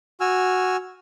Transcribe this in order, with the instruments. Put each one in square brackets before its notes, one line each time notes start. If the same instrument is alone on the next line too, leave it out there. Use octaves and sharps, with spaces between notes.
[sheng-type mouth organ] F#4 G#5 E6 F6